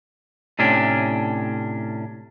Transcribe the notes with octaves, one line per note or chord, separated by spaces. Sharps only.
A2 C3 C#4 D4